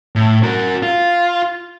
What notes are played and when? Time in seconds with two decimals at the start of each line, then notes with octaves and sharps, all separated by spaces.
0.16 A2
0.43 F#4 A#4
0.83 F4